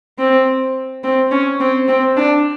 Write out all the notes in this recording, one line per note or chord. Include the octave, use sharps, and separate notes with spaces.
C4
C4
C#4
C4
C4
D4